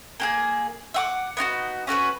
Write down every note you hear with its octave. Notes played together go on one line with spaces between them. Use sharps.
A#3 G4 G#4
E5 F#5 D6
B3 D#4 F4 F#4
C#4 F#4 A#4 B4